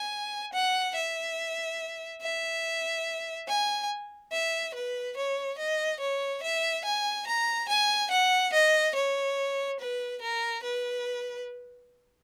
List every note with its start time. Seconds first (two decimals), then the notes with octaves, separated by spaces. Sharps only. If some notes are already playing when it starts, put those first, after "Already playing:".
Already playing: G#5
0.53 F#5
0.95 E5
2.22 E5
3.48 G#5
4.32 E5
4.74 B4
5.17 C#5
5.58 D#5
6.00 C#5
6.43 E5
6.85 G#5
7.27 A#5
7.69 G#5
8.11 F#5
8.53 D#5
8.95 C#5
9.80 B4
10.22 A#4
10.63 B4